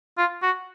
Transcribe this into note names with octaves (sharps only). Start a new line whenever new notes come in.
F4
F#4